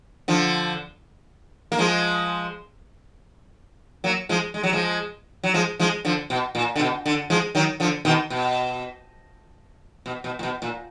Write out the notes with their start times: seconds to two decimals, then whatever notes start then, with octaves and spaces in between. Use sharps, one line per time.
0.28 D3 F3
1.72 A#3
1.79 F3 G#3
4.04 F#3 A#3
4.29 F3 G#3
4.54 G#3
4.63 F#3
4.73 F3 G#3
5.44 F#3
5.54 F3 G#3
5.79 F3 G#3
6.05 D3 F3
6.30 B2
6.55 A#2
6.76 D3
6.80 B2
7.05 D3
7.30 F3 G#3
7.55 D#3 F#3
7.80 D3 F3
8.05 B2 D#3
8.30 B2
10.06 B2
10.24 B2
10.39 A#2
10.43 B2
10.62 A#2